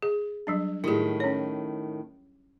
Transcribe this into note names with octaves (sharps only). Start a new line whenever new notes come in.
G#4
F#3 G3 D4
A2 D#3 E4 G4 G#4
C#4 C#5